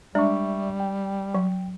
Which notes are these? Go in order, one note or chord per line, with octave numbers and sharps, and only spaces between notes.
G3 G#3 D4 D5 E5 C#6
G5
F#3